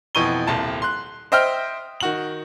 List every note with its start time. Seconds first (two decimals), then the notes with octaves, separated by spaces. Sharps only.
0.15 F2 B2 E3 C#6 D#7 G7
0.47 D#1 C2 A5
0.82 C6 F#6
1.32 C5 D#5 E5 G5 D#6 F6
2.01 D#3 F#4 F#7